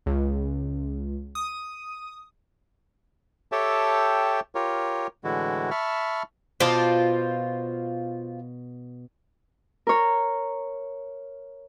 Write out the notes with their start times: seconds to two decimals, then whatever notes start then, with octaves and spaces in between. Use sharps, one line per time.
0.06 C#2
1.35 D#6
3.52 G4 A4 C#5 E5 G5 A5
4.55 F4 G4 A#4 C#5
5.24 A2 D3 E3 G#3 E4 F#4
5.71 E5 A5 B5 C#6 F6
6.60 B2 F4 C5 D5 A5
9.87 A#4 C#5